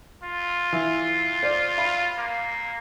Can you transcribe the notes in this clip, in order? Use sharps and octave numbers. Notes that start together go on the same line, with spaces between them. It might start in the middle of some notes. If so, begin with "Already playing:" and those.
F4
E3
C5 D5
F5 B5
A#3